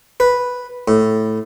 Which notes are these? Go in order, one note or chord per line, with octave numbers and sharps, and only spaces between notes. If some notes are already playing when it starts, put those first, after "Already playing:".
B4
A2